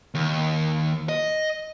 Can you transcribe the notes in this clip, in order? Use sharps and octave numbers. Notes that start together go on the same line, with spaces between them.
D#2
D#5